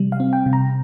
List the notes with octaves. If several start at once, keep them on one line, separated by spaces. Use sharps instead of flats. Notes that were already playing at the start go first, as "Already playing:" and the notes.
Already playing: C3 G3
F5
C4
G5
C3
A#5